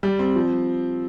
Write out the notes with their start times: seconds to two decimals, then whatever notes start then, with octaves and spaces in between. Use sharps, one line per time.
0.03 G3
0.19 C4
0.36 F3